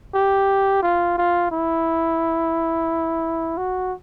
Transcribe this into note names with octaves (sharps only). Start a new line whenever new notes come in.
G4
F4
F4
E4
F#4